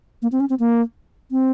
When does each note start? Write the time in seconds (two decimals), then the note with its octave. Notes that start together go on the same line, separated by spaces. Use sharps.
0.22 A#3
0.32 C4
0.40 C#4
0.50 C4
0.60 A#3
1.31 C4